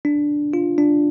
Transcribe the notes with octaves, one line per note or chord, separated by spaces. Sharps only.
D4
F4
D4